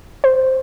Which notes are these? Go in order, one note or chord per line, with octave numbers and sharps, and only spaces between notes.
C5